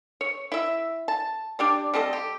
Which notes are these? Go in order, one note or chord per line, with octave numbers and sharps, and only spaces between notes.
C#5
E4 E5
A5
D4 G4 D5
G3 C4 A4 D#5
G4